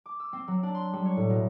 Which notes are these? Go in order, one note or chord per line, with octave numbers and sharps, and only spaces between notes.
D6
E6
C4
F#3
D4
C6
G3
C#5
A2
B2